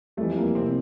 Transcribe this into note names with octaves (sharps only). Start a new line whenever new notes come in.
F2 E3 G3 A3
A#3
C3 C4